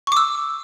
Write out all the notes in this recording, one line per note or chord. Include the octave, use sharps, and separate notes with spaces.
C#6 D6 E6